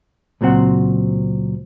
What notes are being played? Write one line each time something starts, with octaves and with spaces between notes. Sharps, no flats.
C#2 A#2 F#3 C4 F#5